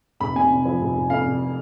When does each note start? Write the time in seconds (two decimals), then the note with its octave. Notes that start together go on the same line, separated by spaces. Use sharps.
0.20 F1 B5
0.35 C3 G#5
0.50 C3
0.65 F3
0.81 F1
0.95 F1
1.10 F2 F5
1.25 F1